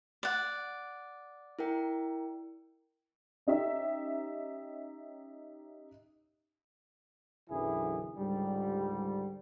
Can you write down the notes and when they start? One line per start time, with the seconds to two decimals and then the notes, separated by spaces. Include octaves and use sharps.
0.23 D5 F#5
1.59 E4 A#4 G5
3.47 C#4 D#4 G4 E5
7.49 B1 F#2 D3 E3 E4 G#4
8.17 C#2 G#2 D3 G3